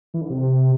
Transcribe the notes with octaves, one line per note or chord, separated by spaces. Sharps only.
E3
D3
C3